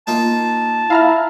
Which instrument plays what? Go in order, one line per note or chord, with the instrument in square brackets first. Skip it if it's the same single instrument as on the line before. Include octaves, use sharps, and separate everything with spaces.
[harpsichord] A#3 D#4 F4 [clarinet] A5
[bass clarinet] E4 [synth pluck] F5 A#5 F6